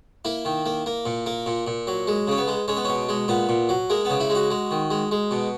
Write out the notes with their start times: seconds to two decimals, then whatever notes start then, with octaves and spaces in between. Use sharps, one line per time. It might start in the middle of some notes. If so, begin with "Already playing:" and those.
0.25 A#3 E4
0.45 D#3
0.66 A#3
0.86 A#3
1.06 A#2
1.26 A#3
1.46 A#2
1.67 A#2
1.87 F#3
2.07 G#3
2.28 C#3 C#4
2.38 B3
2.48 G#3
2.68 G#3 C#4
2.77 B3
2.84 B2 C#4
3.09 G#3
3.28 A#2 B3
3.49 A#2
3.69 F#3
3.90 G#3 A#3
4.05 C#3 B3
4.20 E4
4.30 G#3
4.35 F#4
4.51 G#3
4.71 D#3
4.91 G#3
5.11 G#3
5.31 B2